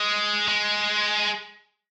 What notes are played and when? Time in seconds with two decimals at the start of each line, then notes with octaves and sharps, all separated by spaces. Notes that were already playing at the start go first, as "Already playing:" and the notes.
Already playing: G#3
0.48 G#3